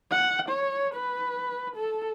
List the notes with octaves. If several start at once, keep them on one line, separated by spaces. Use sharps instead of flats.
F#5
C#5
B4
A4